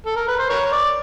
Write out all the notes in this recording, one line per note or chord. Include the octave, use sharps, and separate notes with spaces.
A4
A#4
B4
C5
A#4 C#5
D5